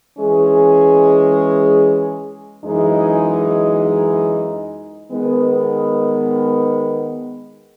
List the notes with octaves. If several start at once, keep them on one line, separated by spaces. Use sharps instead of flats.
E3 G#3 C#4 G#4
F#2 E3 G#3 D#4 G#4
D#3 G#3 B3